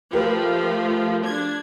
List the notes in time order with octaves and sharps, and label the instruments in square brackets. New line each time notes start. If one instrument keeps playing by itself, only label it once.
[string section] F3 A3 [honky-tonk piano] G4 A#4 B4
[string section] D4 G#6